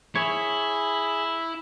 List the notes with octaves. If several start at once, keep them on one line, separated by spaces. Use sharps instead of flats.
E4 G#4 C#5 B5